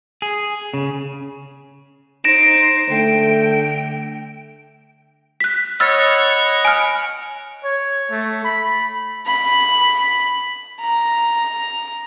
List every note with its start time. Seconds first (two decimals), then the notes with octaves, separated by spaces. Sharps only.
0.22 G#4
0.74 C#3
2.24 D#4 C5 A#6 D7 E7
2.90 D3 A3 G5
5.40 F#6 B6
5.80 C#5 D#5 F#5 B5 E6 F6 A6
6.65 G#5 F6
7.64 C#5
8.11 A3
8.45 B5
9.26 B5
10.80 A#5